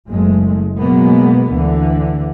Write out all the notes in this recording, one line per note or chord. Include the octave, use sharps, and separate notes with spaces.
F#1 F#2 G#3 A3
B2 F#3 G#3 A#3 B3
D2 D3 E3